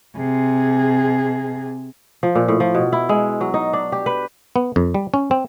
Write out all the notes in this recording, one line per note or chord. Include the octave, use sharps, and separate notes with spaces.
C3 G#4
F3
A#2
A2
F3
B2
E4
G#3
F#3
D#4
D4
G4
B4
B3
F2
G3
C#4
C4